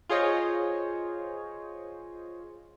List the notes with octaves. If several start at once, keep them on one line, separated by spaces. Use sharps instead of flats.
F4 G#4 C5 C#5 D#5